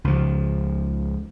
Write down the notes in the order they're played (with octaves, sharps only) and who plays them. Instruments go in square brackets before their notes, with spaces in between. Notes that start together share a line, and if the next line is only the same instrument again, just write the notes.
[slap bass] C#2 F3